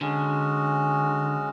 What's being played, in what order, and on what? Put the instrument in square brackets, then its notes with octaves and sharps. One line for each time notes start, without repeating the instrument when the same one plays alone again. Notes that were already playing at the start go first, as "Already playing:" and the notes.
[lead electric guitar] D3 [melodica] G#3 C#4 F#4